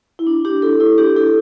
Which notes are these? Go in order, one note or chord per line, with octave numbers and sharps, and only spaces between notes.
E4
D4
D4 G4
E4 A4
E4 A4
D4 G4
E4 A4